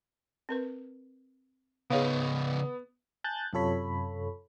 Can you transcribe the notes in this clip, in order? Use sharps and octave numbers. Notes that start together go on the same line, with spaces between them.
C4 A#4 B4
C#3 B3 D#4 G#4 C#5 F5
G#5 A5 F#6 G6 A6
F#2 C3 F4 A4 C#5 B5